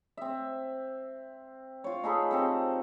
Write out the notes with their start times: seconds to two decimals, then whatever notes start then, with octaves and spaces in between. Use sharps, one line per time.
0.17 C4 E5
1.84 F4 C#5
2.04 D#4 G#4 A4 B4
2.31 C3 C4 A4